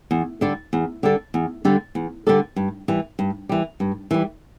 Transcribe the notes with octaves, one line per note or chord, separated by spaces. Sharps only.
E2
D3 G3 D4 A4
E2
D3 G3 D4 A4
E2
D3 G3 D4 A4
E2
D3 G3 D4 A4
G2
E3 G3
G2
E3 G3
G2
E3 G3